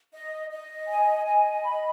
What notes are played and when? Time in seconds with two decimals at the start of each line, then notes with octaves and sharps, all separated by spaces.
0.12 D#5
0.50 D#5
0.87 G#5
1.25 D#5
1.63 B5